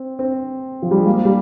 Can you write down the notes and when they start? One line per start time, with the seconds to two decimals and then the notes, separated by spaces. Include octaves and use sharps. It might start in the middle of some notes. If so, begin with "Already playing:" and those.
Already playing: C4
0.19 C4
0.82 F3
0.91 G3
0.98 G#3
1.07 A#3
1.25 G3